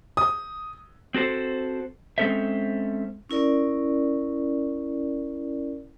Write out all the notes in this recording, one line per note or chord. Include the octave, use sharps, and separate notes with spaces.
D#6
C4 F#4 A4 C5
G#3 C4 C#4 A4 C5 E5
C#4 E4 A#4 D5